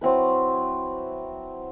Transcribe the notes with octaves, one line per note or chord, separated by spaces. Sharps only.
F#3 C4 E4 B4